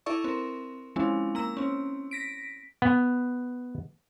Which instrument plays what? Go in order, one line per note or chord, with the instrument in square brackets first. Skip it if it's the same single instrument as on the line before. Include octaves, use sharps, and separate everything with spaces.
[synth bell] E4 A4 D5 E5 C#6
C4 A#4
F3 G#3 C4 C#4 E4
A#3 A#5 E6
C4 C#4
A#6 B6 D7
[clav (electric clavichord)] B3